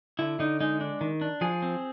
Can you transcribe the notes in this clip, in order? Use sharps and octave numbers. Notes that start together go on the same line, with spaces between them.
D3 E4
D3 D#4
G#3 D#4
D4
D#3
D4
F3 G#4
C4